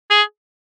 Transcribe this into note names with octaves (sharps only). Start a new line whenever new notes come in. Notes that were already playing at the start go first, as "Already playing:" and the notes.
G#4